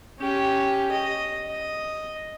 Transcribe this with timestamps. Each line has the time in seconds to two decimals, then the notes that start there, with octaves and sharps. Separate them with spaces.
0.19 C#4 G4
0.91 D#5
1.46 D#5